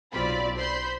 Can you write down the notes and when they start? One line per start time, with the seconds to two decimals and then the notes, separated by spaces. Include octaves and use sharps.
0.12 B1 C4 F4 D5 B5
0.56 C5 B5 C6 G6